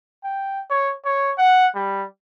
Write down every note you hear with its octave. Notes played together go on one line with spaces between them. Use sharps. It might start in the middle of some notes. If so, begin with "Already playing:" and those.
G5
C#5
C#5
F#5
G3